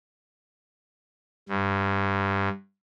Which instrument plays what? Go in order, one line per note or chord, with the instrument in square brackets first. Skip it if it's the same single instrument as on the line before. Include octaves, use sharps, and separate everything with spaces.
[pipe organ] G2